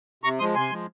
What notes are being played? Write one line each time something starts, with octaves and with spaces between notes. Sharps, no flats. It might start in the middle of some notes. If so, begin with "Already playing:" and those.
C3 A#5 C#6
F3 G#3 C6 D#6
C3 G#5 C6
F3 G#3